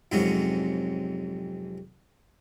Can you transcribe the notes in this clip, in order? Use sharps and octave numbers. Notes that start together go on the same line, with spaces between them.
F2 G#2 C3 F#3 G#3 C#4